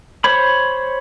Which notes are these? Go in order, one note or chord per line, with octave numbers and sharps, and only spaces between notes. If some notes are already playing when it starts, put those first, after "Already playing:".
C5 C#5 B5